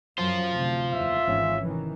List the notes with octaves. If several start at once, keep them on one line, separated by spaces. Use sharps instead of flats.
F#2 F#3 F4 C5
D2 C3
F#1 E2 E5
G#1 E3 C#4
C3 D#3 E3